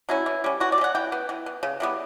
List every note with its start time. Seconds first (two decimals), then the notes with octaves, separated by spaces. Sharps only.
0.09 F#3 C#4 E4
0.26 E3
0.44 G3 C#4
0.60 E3 F#4
0.72 D5
0.78 G3
0.81 C#4 F#5
0.95 E3 G5
1.12 B3
1.29 E3
1.46 B3
1.63 C#3
1.80 E3 G3 B3